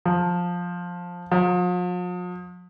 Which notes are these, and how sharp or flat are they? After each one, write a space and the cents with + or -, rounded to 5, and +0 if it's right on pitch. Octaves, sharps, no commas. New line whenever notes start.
F3 +15
F3 +45